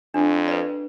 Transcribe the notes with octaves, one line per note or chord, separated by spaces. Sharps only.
F2 D4
B4 D5